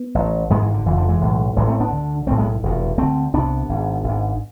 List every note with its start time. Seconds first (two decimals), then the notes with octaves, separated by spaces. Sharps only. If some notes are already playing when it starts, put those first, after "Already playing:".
Already playing: B3
0.15 A1 A2
0.50 G#1 G#2 G#3 B3
0.62 E3
0.74 D3
0.85 F1 F2 D3 E3
0.97 D3 F3
1.09 E3 G#3
1.21 B1 A2
1.56 A1 A2 E3 G#3
1.68 A3 C4
1.80 B3 D4
1.93 D2 D3
2.27 B1 A3 C4
2.31 A2
2.38 G#3 B3
2.63 F1 E2 B2
2.98 D2 D3 A3 C4
3.34 C2 C3 B3 D4
3.69 G#1 G#2
4.04 G#1
4.09 G#2